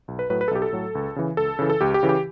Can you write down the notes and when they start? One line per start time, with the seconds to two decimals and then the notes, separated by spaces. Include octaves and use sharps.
0.08 B1
0.19 B4
0.30 A2 F#3 B4
0.41 B4
0.48 A4
0.51 B1 G4
0.62 A4
0.73 A2 F#3
0.95 C#2
1.16 C#3 E3
1.37 C#2 A4
1.59 C#3 E3
1.70 A4
1.81 C#2 G4
1.94 G4
2.03 C#3 E3
2.09 G4